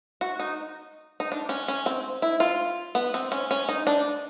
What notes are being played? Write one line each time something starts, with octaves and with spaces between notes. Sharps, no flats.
F#4
D#4
D#4
D4
C#4
C#4
C4
E4
F4
B3
C4
C#4
C#4
D#4
D4